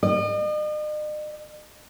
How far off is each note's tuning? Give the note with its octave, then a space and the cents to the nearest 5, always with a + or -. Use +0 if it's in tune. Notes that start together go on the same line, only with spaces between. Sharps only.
D#5 -45